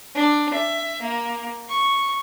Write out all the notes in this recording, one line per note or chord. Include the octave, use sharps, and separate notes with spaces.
D4
E5
A#3
C#6